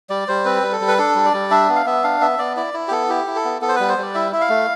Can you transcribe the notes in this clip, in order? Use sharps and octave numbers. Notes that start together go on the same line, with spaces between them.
G3 D5
G3 C5
C4 B4
G3
A4
G3
B4
D4 A4
G3
D5
G3
D4 E5
B3
F5
B3 E5
D4 F5
B3 E5
B3 D5
E4 D5
E4
G4
B3 A4
E4 G4
E4
A4
B3
B3 A4
C5
G3 B4
C5
G3 D5
E4 E5
E4 E5
F5
A3